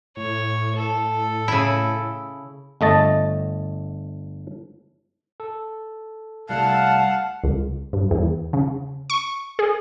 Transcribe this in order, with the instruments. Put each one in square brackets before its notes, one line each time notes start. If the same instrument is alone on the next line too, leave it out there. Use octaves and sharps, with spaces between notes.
[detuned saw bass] A2 [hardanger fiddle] C#5
[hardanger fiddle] A4
[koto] C#3 E4
[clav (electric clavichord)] G1 A3 D#5 A5
[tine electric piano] A4
[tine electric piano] C2 G3 A3 [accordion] F5 F#5 [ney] A5
[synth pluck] C#2
G2
E2
C#3
C#6
G#4